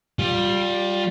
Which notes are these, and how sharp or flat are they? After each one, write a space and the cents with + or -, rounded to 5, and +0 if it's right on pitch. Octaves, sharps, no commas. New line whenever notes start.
G3 +0 F4 +20